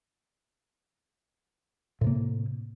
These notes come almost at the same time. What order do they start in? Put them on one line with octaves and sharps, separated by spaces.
A2 C3 A#3